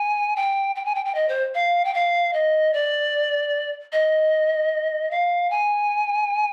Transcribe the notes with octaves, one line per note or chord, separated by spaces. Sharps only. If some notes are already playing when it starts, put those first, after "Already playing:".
Already playing: G#5
G5
G5
G#5
G5
G5
D#5
C5
F5
G5
F5
D#5
D5
D#5
F5
G#5